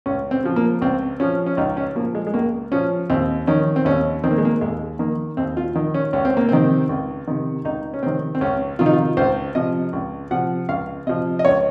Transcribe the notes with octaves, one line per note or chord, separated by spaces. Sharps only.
C#2 C#4
C4
C#3 F3
A#3
C#2 C4
C#3 F3 C#4
C#4
C#2 D#4
C#4
C#3 F3 A#3
G#3
G#3
C#2 A#3
C#3 F3 C#4
D#2 C4
D#3 C#4
C4
D#2 C#4
D#3 C4
A#3
G#3
A#3
D#2 G#3
D#3 A#3
D#2 C4
F4
D#3
C#4
C#2 C#4
C4
A#3
C3 D#3 C4
C#2
C3 D#3
C#2 D#4
C#4
C3 D#3 C4
C4
C#2 C#4
C3 D#3 F4
D#4
F4
C#2 C5
C3 F3 D#5
C#2
C3 F3 F#5
C#2 F5
C3 F3 D#5
D#5
C#2 C#5